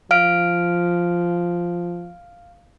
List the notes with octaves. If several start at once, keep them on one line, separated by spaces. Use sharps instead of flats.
F3 F5 F6 D7